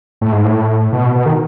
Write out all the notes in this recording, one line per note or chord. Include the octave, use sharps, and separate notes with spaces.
A2
G#2
A2
B2
B2
D#3